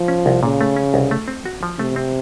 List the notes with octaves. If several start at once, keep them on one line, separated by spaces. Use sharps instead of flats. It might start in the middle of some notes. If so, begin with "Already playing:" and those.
Already playing: F3
C#4
C2
A#2 C#3
A3
C#4
C2
A3
C4
F#4
F3
C3 A3
C4